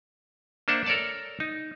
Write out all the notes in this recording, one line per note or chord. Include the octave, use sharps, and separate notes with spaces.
A#3 D4 C5 E5 F#5
A4 A#4 C#5 D5 A5
D#4